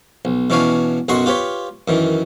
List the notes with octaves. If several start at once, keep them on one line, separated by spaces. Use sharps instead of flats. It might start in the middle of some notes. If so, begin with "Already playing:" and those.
B1
B2 E3 C#4 D4 C#5 F5
B1 F#2 F#4 D#5 C6 C#6
F4 G4 B4 C#5
F#2 D#3 E3